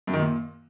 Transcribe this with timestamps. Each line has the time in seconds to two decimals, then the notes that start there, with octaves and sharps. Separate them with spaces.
0.07 F#2
0.13 D#3
0.19 A#2